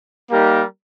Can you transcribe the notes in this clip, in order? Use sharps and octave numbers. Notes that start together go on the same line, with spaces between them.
G3 A#3 D#4 G4 A#4